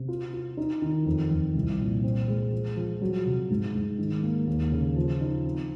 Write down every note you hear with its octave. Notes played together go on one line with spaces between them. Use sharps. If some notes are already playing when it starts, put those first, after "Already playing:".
Already playing: C3
F4
F4
D#4
D#3
F2
F2
C2
A#2
C4
G#3
F3
F3
F#3
C3
G#2
G#2
D#3
A#3
D#2
C#3
F3
D#4
C4